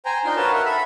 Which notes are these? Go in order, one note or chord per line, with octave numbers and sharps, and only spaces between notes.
C5 G5 G#5 A#5
D4 D#4 F4 G5 C6
F#4 A#4 B4 C#5 F5 A5
E5 F#5
A4 E5 B5